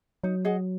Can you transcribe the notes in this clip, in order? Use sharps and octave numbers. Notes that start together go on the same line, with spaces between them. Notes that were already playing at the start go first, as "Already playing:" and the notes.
F#3 D#4
G#4 D#5 F#5